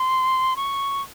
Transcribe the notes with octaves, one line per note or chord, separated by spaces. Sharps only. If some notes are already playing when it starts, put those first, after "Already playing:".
Already playing: C6
C#6